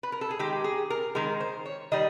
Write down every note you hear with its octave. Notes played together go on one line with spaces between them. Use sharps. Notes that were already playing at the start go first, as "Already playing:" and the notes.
B4
A#4
A4
G#4
D#3 G#3 G4
G#4
A#4
D#3 G#3 A#4
C5
C#5
D#3 G3 D#5